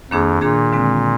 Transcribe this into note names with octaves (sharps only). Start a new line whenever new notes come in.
F2 D#3 A#3 D4 G#4
A#2 D#3 A#3 D4 G#4
D3 G#3 C4